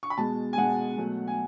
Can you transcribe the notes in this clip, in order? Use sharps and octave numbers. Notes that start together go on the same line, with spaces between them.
C#6
B5
B2 G#3 A5
G#5
B2 G#3 F#5
B2 F#3 A3
G#5